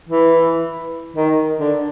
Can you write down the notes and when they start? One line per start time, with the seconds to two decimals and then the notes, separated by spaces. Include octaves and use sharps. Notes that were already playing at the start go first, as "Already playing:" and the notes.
0.09 E3
1.16 D#3
1.59 D3